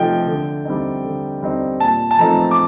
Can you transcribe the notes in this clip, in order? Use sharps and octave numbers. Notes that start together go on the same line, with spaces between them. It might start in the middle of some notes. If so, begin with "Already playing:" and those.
Already playing: C3 F3 A3 D#4 G5
D3
G3 C4 D#4
D3
G3 C4 D#4
A#2 A5
A5
F3 A3 C4 D#4 A#5
D6